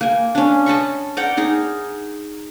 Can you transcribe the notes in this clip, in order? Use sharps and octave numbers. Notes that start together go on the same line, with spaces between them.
A#3 G#5
C#4 D4
D#5 A5 B5 C#6
A#4 D5 F#5 G5
D#4 G#4 A#5